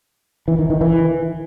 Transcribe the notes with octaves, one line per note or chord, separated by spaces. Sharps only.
E3
D#3
D#3
E3